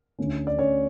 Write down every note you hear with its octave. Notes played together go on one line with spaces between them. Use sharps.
D2 D3 A3 C#4
D5
C#4 C#5